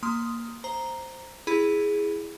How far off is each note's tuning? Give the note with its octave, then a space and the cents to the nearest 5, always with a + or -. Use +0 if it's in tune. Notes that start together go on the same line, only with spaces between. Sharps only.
A#3 +0 C6 +0 D#6 +5
C5 +0 A#5 +0
E4 +0 G#4 -5 B5 +0